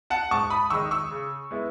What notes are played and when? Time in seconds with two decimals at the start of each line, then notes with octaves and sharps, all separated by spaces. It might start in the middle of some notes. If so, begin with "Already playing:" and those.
0.10 F#5 A5
0.31 G#2 A5 C#6
0.50 B5 D#6
0.70 D#3 G#3 D#4 C#6 E6
0.91 C#6 E6
1.11 C#3
1.51 G#3 B3 E4